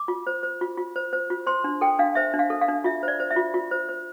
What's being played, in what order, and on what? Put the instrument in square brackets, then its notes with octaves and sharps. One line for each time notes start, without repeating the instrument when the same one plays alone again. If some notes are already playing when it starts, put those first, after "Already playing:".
Already playing: [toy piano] D6
F4
C5
C5
F4
F4
C5
C5
F4
C5 C6
D4
A4 G5
D4 F5
C5 E5
D4
F5
A4
F5
D4
F4 E5
C5
D5
C5
E5
F4
F4
C5
C5